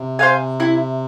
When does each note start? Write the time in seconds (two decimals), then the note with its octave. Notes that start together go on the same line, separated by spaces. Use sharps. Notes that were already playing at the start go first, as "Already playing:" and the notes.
Already playing: C3
0.19 C5 F5 G#5
0.60 E4